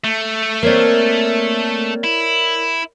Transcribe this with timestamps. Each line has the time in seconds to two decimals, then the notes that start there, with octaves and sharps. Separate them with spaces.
0.04 A3
0.63 A#3 C4 A#4 C#5 D5
2.04 E4